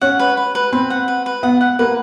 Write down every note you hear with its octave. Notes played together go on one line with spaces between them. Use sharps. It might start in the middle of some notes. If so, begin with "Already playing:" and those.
C#4 F#5
B4
B4
B4
C4 B4
F#5
B4
B4
B3 F#5
F#5
A#3 B4